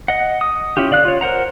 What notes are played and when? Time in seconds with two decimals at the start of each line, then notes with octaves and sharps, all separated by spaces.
0.08 D#5 F#5
0.41 D#6
0.77 C#4 E4 F4 G4
0.91 D3 D5 F5 F#6
1.05 F4 C#5
1.21 A#4 C5 F#5 A#5